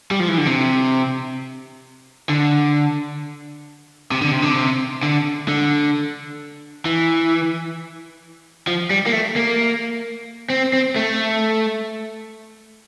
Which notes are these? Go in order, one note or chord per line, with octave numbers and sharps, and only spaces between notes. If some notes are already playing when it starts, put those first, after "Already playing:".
G3
F3
E3
D3
C3
D3
C3
D3
C3
D3
C3
D3
D3
E3
F3
G3
A#3
A3
A#3
C4
C4
A3